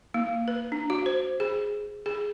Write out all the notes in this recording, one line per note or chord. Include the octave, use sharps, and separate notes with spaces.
A#3
B4
D4
F#4
C5
G#4
G#4